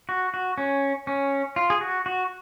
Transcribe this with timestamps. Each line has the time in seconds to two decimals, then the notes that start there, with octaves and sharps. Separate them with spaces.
0.09 F#4
0.34 F#4
0.58 C#4
1.07 C#4
1.56 F4
1.70 G#4
1.81 F#4
2.06 F#4